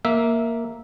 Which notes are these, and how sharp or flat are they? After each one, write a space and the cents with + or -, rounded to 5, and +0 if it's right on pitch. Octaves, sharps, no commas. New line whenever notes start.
A#3 +0 E5 -10